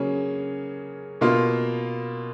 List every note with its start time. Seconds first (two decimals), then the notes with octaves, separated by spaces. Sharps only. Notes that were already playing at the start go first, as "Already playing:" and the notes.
Already playing: C#3 F#3 A#3 C#4 G#4
1.21 B2 A#3 F4